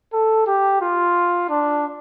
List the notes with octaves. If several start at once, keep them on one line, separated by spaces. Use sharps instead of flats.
A4
G4
F4
D4